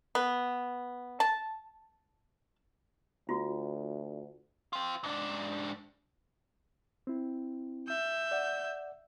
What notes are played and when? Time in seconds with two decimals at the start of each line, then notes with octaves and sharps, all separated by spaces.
0.15 B3
1.20 A5
3.29 D2 F4 F#4
4.73 C4 F4
5.04 G#2 D4
7.07 C4 E4
7.88 E5 G6
8.31 D5 F#5